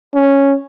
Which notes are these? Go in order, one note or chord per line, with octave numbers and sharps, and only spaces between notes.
C#4